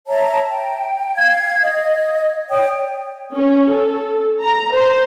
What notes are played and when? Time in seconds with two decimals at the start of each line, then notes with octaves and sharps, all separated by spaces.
0.07 C#5 E5 A5 A#5
0.48 G5
1.15 F5 G#6
1.62 D#5
2.50 C#5 D5 G5 D#6
3.34 C#4
3.72 A4
4.42 A#5
4.74 C5